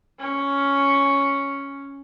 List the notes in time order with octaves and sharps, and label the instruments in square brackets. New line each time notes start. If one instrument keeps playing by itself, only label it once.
[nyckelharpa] C#4